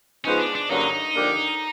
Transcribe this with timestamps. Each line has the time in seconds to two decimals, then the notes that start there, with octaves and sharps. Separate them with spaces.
0.25 F3 G#3 B3 C#4 D#4 G#4
0.40 D4
0.55 D4
0.70 G2 D3 F#3 A#3 C#4 D#4
1.15 D3 F3 A#3 D4 G4